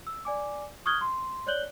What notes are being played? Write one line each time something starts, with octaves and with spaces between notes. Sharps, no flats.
E6
D5 G#5 D6
C#6 D#6 F6 F#6 G#6 G7
C6
C#5 D5 F#6 G6 F#7 G7